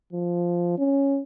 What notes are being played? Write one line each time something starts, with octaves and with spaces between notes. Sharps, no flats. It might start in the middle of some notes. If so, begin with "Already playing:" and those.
F3
C#4